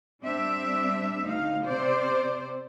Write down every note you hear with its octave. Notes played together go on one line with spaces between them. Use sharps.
G3 C4 D4 E5
D2 D#4 F5
C3 C4 C5 D5